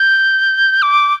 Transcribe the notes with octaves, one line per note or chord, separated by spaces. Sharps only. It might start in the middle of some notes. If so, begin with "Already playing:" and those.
Already playing: G6
D6